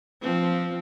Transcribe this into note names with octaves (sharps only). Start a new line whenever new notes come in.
F3 C4